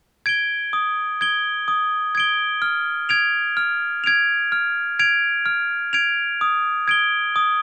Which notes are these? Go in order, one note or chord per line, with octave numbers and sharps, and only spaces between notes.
G#6 D7 G7
D#6
G#6 D7 G7
D#6
G#6 D7 G7
F6
G#6 D7 F7
F6
G#6 D7 F7
F6
G#6 D7 F7
F6
G#6 D7 F7
D#6
G#6 D7 G7
D#6